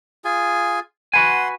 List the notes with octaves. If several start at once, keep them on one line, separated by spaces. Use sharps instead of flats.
F4 G#4 G#5
F#4 B4 F#5 G#5 C6